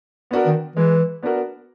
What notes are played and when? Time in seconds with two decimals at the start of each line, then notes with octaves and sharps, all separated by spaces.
0.31 B3 D4 F#4 A#4
0.46 D#3
0.76 E3 G#3
1.22 B3 D4 F#4 A#4